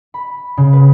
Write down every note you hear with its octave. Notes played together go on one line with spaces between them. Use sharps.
B5
C#3
B4